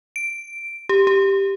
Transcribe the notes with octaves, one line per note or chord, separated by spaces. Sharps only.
D7
G4
G4